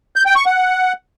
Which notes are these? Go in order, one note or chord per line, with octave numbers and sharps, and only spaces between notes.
G6
G5
C#6
F#5